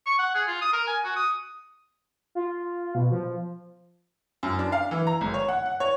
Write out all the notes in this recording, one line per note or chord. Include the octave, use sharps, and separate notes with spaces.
C#6
F#5
G#4
F4
D#6
A#4
G#5
F#4
D#6
F4
B2
F3
F#2
D4
F5
E3
A#5
G#1
C#5
F#5
F#5
C#5